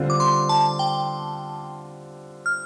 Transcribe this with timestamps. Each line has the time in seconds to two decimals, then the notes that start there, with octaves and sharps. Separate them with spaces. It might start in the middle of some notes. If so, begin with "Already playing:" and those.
Already playing: D3 G3 C4 F4
0.10 D6
0.20 C6
0.49 A5
0.79 G5
2.46 F6